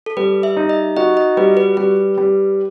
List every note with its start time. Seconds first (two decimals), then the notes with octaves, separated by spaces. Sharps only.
0.06 A4
0.17 G3 B4
0.43 E5
0.57 D#4
0.69 D#5
0.97 F#4 D#5
1.17 D#5
1.37 G3 B4
1.57 B4
1.77 G3 B4
2.18 G3